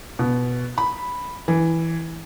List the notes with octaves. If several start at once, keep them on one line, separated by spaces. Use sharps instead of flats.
B2
B5
E3